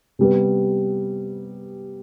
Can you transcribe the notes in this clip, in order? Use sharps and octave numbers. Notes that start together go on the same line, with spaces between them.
C3 G3 B3